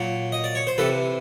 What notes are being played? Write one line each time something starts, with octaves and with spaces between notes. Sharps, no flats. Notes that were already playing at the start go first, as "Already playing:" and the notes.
Already playing: A#2 F#3
D#5
D5
C#5
C5
C3 E3 A4 B4